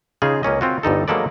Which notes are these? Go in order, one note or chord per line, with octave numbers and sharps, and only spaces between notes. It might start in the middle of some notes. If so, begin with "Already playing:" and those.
C#3 D#4 F4 G#4
C#2 A#3 C#4 D#5
C4 F4 F#4
G1 G2 D#4 A4
F#3 G#3 A#3 A4 B4 D5